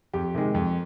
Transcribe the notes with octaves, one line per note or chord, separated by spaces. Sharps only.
F2 G4
C3 D#3 G#3
F2